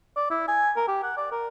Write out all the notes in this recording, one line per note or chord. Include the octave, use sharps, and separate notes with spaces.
D5
E4
G#5
A#4
G4
F#5
D5
A#4